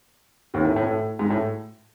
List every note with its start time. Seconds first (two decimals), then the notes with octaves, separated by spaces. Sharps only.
0.54 D#2 D#3
0.65 A2
0.76 A2
0.87 A2
1.19 G#2
1.30 A2